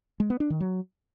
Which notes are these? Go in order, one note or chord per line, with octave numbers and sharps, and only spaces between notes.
G#3
B3
D4
D#3
F#3